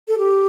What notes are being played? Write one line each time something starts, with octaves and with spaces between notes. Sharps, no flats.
A4
G4